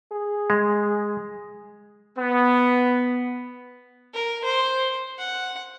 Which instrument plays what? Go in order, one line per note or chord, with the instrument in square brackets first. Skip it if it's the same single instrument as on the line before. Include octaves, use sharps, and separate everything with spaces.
[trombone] G#4
[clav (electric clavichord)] G#3
[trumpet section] B3
[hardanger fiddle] A#4
C5
F#5